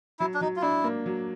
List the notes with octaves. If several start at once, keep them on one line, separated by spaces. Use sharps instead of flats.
F#3 E4
D4
F#3 D#4
F4
D4 E4
A#3
F#3